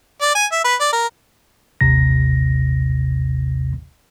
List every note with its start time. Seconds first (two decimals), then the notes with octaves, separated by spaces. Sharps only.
0.21 D5
0.35 G#5
0.52 E5
0.64 B4
0.80 D5
0.93 A#4
1.81 A1 D#2 C3 A#6